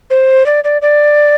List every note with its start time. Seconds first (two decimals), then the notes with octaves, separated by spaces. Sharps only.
0.10 C5
0.46 D5
0.64 D5
0.82 D5